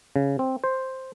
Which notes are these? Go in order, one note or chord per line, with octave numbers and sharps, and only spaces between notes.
C#3
C4
C5